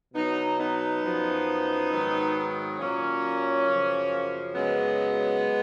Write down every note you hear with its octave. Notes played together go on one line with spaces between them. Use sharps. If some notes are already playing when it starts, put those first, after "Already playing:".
B2 F#3 B3 D#4
B3 D#4
F#2 F3
G#2 D#3 F#3
A#2 F#3 A#3 C#4
F#2 C#3 F3
F#2 C#3 F#3 G#3 B3